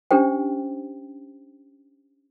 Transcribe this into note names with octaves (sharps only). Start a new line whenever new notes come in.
C#4 D4 G4 C5 G5